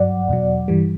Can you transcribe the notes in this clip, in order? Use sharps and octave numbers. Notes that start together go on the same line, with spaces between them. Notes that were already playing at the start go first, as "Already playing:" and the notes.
Already playing: G2 F#3 D5 F#5
E2 B2 F#3
G2 E3 G3